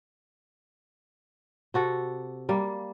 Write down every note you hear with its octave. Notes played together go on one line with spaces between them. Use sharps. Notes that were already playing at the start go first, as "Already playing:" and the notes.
C3 F#4 A4
G3 A#3